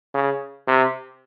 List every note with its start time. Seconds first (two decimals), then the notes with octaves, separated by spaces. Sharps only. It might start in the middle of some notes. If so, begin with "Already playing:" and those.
0.14 C#3
0.68 C3